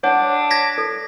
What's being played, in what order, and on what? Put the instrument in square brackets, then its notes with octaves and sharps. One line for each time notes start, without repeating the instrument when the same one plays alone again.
[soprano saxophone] D4 [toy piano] C#5 F#5
[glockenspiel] G#6 A#6 B6
[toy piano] A4